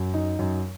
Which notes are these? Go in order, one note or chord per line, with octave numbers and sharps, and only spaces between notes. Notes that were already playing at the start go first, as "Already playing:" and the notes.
Already playing: F#2
D#4
F#2